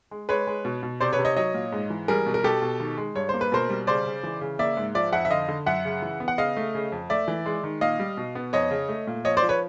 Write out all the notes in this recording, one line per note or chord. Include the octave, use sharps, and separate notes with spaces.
G#3
G#3 B4 C#5
G#3
B2
B2
C3 C5 D5
B4 C#5
C3
C#5 D#5
F#3 C#5 D#5
A#2
G#2
E3
G3 G#4 A#4
B2
A#4
B2 G4 A4
B2
D#3
G#3
G2 C#5
A#3 C5
B4
B2 A#4 C5
G3
C#3 C5 D5
C#3
E3
C#3
A#3 D5 E5
G#2
F3 D5 E5
F2 E5 F#5
E5
D3 D#5 F5
D3
F#2 E5 F#5
C#3
E3
B3
F#5
C#3 D#5 F5
A3
C#3
F2
A3 D5 E5
E3
G#3
D#3
A#2 D#5 F5
G3
B2
B3
F2 C#5 D#5
C#3
A3
A#2
F3 C#5 D#5
C5 D5
F3
B4 C#5